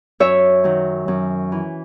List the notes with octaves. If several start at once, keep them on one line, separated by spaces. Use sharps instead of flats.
F#2 C#5 E5
D#3 F#3
F#2
E3